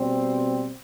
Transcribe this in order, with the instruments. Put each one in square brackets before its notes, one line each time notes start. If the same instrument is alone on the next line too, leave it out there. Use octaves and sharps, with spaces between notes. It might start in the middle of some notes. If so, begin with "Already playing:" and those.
Already playing: [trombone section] B2 G3 C4